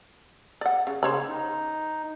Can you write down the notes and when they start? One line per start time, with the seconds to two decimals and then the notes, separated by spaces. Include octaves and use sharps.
0.61 D5 F#5
0.87 C#3
1.03 C#3 C5 C#5 B5
1.29 D#4